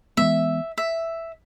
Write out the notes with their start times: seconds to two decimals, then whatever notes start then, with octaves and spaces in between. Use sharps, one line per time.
0.17 E3 G#3 B3 E5
0.78 E5